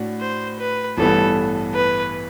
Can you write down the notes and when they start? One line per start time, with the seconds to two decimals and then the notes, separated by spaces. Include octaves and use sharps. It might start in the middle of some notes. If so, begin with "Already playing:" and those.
Already playing: A2 D4 F#4
0.21 C5
0.60 B4
0.98 A1 G2 E3 B3 A4
1.75 B4